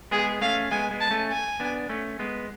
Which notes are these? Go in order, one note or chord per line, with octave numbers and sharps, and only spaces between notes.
G#3 B3 G#4
A3 C#4 F5
G#3 B3 G#5
G#3 B3
A5
A3 C#4
G#5
B3 D4
A3 C#4
G#3 B3